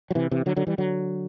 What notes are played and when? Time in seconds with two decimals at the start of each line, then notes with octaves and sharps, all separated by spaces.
0.11 F#3
0.15 C3 E3
0.31 C3 E3
0.46 D3 F#3
0.57 D3 F#3
0.67 E3 G3
0.78 D3 F#3